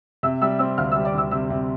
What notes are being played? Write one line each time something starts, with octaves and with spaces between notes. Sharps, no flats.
C3 E5 E6
G3 E5 E6
C4 E5 E6
D2 F5 F6
G3 E5 E6
D5 D6
D2 E5 E6
C3 E5 E6
C3